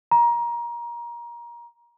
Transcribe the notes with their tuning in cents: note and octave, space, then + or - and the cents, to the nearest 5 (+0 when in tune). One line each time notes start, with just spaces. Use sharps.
A#5 +25